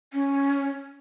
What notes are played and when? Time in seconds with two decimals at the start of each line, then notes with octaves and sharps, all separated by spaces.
0.13 C#4